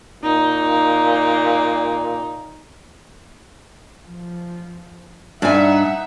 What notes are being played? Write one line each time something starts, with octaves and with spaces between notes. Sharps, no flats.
A#2 D#4
F3
G2 D#4 E5 F#5 G#5